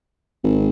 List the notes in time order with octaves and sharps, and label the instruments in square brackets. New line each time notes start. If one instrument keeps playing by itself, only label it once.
[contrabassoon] G#1